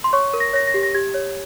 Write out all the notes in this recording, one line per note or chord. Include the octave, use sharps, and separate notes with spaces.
C6
C#5 C#6
A#4
A#6
C#5 A#6
A#6
G4
A#6
G4 G#6
C#5